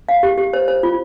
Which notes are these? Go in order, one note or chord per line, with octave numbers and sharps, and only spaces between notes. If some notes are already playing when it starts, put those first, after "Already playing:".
F5
G4
G4
C5
C5
F4